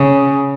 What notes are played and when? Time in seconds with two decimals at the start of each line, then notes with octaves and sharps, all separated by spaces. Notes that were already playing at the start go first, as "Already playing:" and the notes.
Already playing: C#3